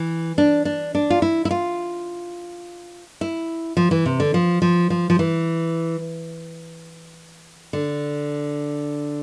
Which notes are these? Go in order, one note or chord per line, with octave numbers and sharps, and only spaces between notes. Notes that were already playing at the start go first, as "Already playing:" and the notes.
Already playing: E3
D4
D4
D4
F4
E4
E4
F4
E4
F3
E3
C3
D3
F3
F3
F3
F3
E3
D3